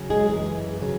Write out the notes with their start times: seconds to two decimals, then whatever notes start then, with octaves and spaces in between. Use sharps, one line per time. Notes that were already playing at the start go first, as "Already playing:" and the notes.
Already playing: C#3 F#3 C#4
0.10 G#3 G#4
0.28 F#2 E3 G#3
0.82 C#3 F#3